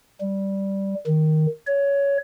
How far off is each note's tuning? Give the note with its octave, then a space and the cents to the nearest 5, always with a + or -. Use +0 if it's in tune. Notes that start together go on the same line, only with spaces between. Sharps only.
G3 -5
D#3 +0
C#5 +15